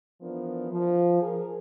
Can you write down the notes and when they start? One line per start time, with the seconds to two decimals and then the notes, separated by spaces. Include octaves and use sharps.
0.21 E3 F3 B3 D4 A#4
0.70 F3
1.21 G#4 A#4